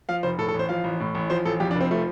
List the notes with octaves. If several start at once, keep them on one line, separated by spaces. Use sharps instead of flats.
F3 F5
F1 C5
A2 A4
A4
A1
C5
F3 F5
A1
A2
A1
F3 C5
A1 A4
F2 G4
D4
F1
C4
F3 A3